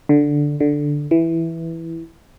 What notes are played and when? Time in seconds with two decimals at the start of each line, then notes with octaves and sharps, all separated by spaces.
0.09 D3
0.60 D3
1.11 E3